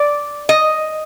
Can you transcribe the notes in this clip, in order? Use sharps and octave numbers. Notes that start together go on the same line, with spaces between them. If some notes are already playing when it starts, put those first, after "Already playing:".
Already playing: D5
D#5